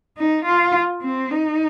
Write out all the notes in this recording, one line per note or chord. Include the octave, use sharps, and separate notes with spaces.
D#4
F4
C4
D#4